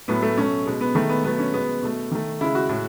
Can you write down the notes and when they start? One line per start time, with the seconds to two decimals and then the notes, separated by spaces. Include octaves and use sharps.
0.08 A2 F#3 A3 B3
0.23 A3
0.37 B2 F#3 A3 C#4
0.66 B2 G#3
0.81 B3
0.95 D#3 G#3 A3
1.09 B3
1.24 B2 F#3 A3 B3
1.39 C#4
1.53 B2 G#3 B3
1.83 B2 A3
2.12 D#3 A3
2.41 C#3 G#3 E4
2.55 F#4
2.69 A2 G#3